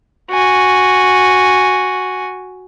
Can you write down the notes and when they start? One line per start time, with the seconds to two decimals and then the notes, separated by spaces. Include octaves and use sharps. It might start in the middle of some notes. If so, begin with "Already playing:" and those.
0.32 F#4 G#5